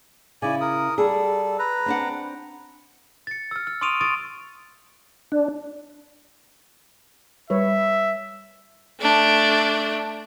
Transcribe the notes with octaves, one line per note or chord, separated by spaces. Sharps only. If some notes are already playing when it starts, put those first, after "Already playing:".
C#3 E4 D5 G#5
A#4 D#6
G3 G#4 A4
B4 A#5
C4 D4 F#5
A6 C#7
E6 F6
F6
C6 C#6 D#6 D7 D#7 F7
C#6 D#6 A6 D7 D#7
D4
G3 B4 C#5 E5
A3 D4